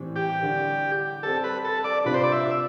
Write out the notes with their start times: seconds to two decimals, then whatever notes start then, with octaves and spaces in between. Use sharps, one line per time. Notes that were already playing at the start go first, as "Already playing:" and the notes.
Already playing: A2 E3 G3 C4
0.16 G4
0.42 D3 G3 D4
1.23 G3 C4 G4 A4
1.44 B4
1.64 A4
1.84 D5
2.04 C3 G3 D4 F4 B4
2.14 C5
2.23 D5
2.32 E5